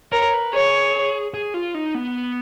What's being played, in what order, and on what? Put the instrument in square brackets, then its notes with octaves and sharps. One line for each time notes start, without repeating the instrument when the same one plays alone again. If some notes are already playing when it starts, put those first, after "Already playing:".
[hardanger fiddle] A#4 [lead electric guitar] C#5
[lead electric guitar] B4
[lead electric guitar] G#4 [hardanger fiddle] C#5
[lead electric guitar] G#4
F4
D#4
B3